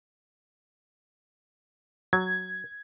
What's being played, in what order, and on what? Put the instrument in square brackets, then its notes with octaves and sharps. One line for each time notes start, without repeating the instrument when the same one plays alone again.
[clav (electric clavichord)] F#3 [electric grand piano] G#6